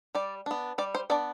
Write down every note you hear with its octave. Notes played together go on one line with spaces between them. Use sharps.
G3 D5
B3 D4
G3 D5
C5
B3 D4 D5